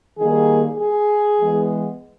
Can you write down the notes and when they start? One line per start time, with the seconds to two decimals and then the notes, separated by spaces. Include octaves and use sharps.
0.18 D#3 G3 A#3 G#4
0.78 G#4
1.40 E3 G#3 B3